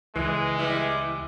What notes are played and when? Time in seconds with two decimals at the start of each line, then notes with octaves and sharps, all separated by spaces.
0.16 C#2 E3 G#3
0.59 E3 G3 E4